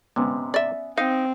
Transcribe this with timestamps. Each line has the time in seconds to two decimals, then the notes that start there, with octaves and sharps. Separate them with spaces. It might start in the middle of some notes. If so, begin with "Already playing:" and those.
0.16 G#2 C3 B3 C#4
0.54 D5 E5
0.98 C4 D#4 F5